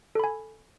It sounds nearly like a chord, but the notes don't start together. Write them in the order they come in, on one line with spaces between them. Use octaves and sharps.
A4 B5 G#5